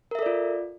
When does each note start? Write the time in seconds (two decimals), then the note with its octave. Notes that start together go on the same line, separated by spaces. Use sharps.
0.11 A#4
0.15 E5
0.19 A4
0.22 D5
0.26 F4